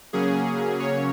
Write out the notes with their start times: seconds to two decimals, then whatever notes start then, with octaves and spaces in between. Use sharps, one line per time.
0.13 C#3 F#3 A#3 C#4 G#4
0.80 C#5